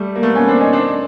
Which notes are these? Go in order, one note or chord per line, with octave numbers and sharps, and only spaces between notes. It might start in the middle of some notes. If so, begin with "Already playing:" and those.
Already playing: G3 A3
A#3
A3 B3
B3 C#4
C4 D4
C#4 D#4
C4 D4